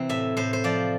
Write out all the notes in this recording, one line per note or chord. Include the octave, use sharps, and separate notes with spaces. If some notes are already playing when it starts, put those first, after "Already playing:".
Already playing: C3 E3 C4
A2 E5
A2 C5
C5
F3 D5